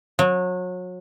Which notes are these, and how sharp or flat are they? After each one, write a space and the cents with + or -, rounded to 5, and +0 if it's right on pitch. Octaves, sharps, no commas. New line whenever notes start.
F#3 -30